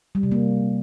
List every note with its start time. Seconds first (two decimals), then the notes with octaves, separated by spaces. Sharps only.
0.15 G3
0.23 C3
0.31 A#3